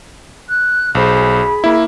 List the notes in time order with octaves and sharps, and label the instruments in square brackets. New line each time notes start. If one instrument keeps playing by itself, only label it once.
[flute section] F#6
[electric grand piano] B1 C5 [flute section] G#4 B5
[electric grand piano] A#3 E4